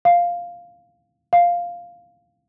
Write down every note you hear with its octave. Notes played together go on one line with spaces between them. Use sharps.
F5
F5